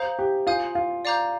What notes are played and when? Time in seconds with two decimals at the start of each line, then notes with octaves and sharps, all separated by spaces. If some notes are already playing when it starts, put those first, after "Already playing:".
Already playing: C5 F5 A#5 D#6 G6
0.19 G4
0.47 F4 F5 G#5 D#6 G6
0.75 F4
1.05 D5 F5 A#5 D6 G6